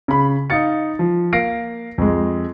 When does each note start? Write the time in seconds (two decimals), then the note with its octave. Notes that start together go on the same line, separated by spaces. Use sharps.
0.08 C#3 B5
0.50 D#4 F5 A6 C#7
0.99 F3
1.33 A#3 F5 A#6 C7 D7
1.98 F2 G#3